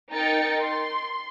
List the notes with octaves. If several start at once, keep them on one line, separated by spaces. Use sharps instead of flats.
D#4 A#4 G5 A6 C#7
C6